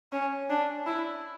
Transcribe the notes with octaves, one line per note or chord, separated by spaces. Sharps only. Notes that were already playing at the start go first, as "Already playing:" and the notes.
C#4
D4
E4